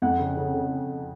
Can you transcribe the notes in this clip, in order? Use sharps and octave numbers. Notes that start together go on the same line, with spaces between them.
F2 F#5
C#3
C#3
C#3